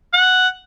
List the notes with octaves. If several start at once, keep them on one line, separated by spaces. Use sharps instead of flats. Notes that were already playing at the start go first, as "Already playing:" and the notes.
F#5